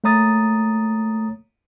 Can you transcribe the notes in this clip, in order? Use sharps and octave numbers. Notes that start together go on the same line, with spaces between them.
A3 A#3 C#5 A#5 D#6 A6